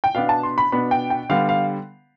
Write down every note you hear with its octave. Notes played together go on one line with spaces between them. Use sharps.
G5
B2 B3 D4 F5
A5
C6
B5
B2 B3 D4 B5
G5
G5
D3 G3 B3 F5
F5